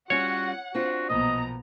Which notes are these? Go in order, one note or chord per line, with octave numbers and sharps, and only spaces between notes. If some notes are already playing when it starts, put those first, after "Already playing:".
G3 C#4 F4 F#4 C#5 F#5
C4 D4 F4 F#4
B1 A#2 F3 B3 D#5 A#5